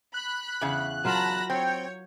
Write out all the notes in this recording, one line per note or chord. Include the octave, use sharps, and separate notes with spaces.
B5 F#6
E2 C#3
F#3 F4 A#4 A5 B5 A#6
C4 C#5 G5